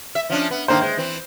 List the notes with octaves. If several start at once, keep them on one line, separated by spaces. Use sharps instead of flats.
E5
F3 C#4 D4
B3
D#3 A3 A#3 D4 C5
G#3 C5
E3 C4